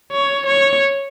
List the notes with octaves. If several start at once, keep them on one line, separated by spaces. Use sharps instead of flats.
C#5
C#5